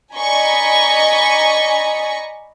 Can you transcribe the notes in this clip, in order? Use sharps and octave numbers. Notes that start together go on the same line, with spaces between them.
D5 D#5 G#5 A#5 B5 C#6